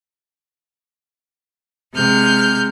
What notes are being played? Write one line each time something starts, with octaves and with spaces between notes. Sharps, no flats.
C3 G#3 F6 G6